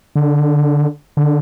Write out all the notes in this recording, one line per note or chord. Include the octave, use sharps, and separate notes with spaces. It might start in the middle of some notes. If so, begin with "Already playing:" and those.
D3
D3